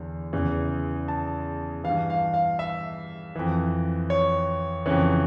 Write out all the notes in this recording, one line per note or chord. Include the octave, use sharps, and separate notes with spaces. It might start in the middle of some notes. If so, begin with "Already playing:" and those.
Already playing: E2 D3
E2 C#3 E3
A5
E3 F5
G2
F5
F5
E5
F2 E3
C#5
F2 C#3 E3 C#5